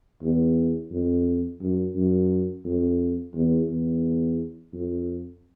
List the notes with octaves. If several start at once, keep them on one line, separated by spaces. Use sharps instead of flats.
E2
F2
F#2
F#2
F2
E2
E2
F2